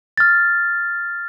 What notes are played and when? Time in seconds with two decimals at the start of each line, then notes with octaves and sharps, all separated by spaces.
0.18 F6 A6